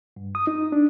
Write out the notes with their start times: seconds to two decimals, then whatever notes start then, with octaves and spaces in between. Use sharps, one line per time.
0.16 G2
0.35 D#6
0.47 D#4
0.72 D4